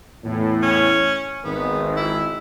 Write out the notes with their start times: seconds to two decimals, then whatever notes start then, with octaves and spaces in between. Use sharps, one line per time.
0.24 E2 A2
0.63 C#4
1.44 G#1 B3
1.97 E4